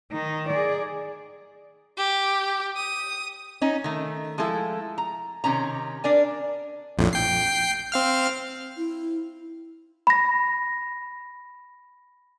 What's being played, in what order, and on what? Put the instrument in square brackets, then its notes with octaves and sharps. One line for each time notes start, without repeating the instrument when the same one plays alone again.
[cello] D#3 D#4
G#4 D5
[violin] G4
D#6
[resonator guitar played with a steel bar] C#4 D#4
D#3 A3
F3 G#3 A3 E4 A4
A#5
C3 D#3 C#4 A#5
D4 A#4 D5 G#5
[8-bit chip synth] A#1 F2 A2
G5 C7
C4 F5 F6
[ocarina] E4
[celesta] B5 A#6